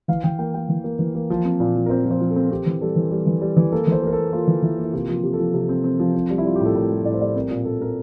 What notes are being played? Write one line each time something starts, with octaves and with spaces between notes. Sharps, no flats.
E3 F5
E3 G5
A#3 G5
A#3 G5
E3
A#3
E3
A#3
F3
C4
A#2
F3
A#4
C4 C5
F3
C5
F3
A4
C4
C4 G4
E3
G3 A4
E3
G3
E3
G3
E3
A#3 A4
E3 C5
A#3 A#4
A#3 A4
A#3 F4
E3
E3 E4
A#3
E4
C3 F4
F3 F4
G4
C3
A4
F3
C3
C4
C4
F3
C4
G3
E4
G3 F4
G4
A2
A4
A2 A#4
G3
A2 D5
C5
G3 D5
C4 A#4
A#2
A#2 A4
C4 A#4